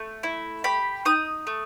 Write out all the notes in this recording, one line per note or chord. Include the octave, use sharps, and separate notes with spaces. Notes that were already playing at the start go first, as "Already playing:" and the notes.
Already playing: A3
E4
G4 B5
D#4 D#6
A3